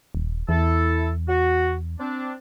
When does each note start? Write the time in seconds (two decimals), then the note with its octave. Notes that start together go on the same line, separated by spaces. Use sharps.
0.15 D#1
0.49 E2 E4 A4
1.28 F#4
1.99 C4 D4